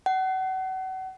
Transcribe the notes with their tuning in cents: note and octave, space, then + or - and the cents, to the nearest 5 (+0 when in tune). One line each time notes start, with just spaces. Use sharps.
F#5 +35